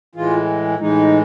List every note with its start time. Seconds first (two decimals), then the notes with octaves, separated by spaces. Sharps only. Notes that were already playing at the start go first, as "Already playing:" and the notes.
0.15 A2 E3 G#3 F4
0.79 A2 E3 G#3 D#4